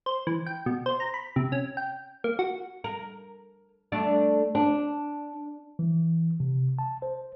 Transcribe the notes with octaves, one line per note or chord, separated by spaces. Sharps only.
C5
E3
G5
B2
C5
A#5
B5
C3
C#4
G5
A#3
F#4
A#4
A3 D4 D5
D4
E3
C3
A5
C5